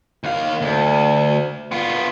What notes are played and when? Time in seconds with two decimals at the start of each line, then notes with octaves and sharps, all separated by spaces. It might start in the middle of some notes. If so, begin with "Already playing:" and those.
0.24 D#2 F5
0.61 D2
1.72 B3 F4